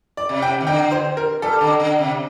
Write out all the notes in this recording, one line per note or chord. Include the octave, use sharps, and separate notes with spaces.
D5
C3
G5
D#3
D3 G5
C5
A#4
G3 A4
D3
D3
C3